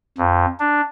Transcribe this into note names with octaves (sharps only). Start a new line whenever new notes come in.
F2
D4